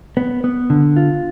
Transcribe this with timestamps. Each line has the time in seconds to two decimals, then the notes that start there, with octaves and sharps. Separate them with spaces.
0.17 B3
0.44 B3
0.70 D3
0.96 F4